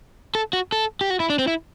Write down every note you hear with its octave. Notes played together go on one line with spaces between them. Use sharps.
A4
F#4
A4
G4
F#4
E4
D4
C4
E4